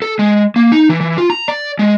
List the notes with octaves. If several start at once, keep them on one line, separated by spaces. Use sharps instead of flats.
A4
G#3
A#3
D#4
E3
E3
F4
A#5
D5
G#3